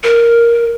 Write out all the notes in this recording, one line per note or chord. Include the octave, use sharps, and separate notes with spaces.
A#4